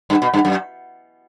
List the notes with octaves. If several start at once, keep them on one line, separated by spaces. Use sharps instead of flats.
G2
B2
G2
F#2